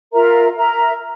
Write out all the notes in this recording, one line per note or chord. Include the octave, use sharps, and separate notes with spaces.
F4 A#4 E5 A#5
A#4 E5 A#5